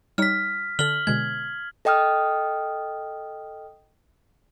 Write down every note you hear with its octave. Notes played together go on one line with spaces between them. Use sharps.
G3 D#4 C#5 F6 B6
D3 A4 F6 F#7 G7
B2 D3 G#3 G#6
A4 D#5 G5 D#6 F6